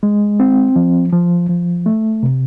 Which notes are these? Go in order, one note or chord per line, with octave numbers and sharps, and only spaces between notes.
G#3
C4
F3
F3
F3
A3
C3